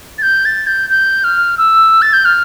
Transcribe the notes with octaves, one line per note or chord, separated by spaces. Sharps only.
A6
G6
A6
G6
G6
F6
E6
A6
G6
F6